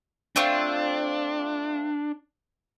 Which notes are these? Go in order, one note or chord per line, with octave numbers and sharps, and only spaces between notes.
A3 C4 D4 F4